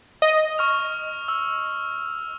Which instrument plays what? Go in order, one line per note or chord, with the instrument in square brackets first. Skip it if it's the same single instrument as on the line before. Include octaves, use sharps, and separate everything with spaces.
[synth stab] D#5
[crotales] C#6 F6 F7
E6